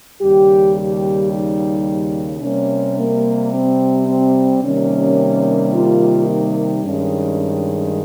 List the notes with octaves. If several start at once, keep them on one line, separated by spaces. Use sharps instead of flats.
D#2 C#3 G3 G4
G4
D#4
C3 G3 A#3 C#4
A#3
C4
C4
C3 D#3 G3 A#3 C#4
F4
D#4
G2 D#3 G#3 C#4